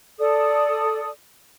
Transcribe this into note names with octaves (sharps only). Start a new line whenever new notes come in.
A4 D5 D#6